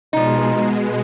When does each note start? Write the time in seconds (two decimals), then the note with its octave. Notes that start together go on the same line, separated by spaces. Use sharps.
0.13 B2 F3 G#3 D#4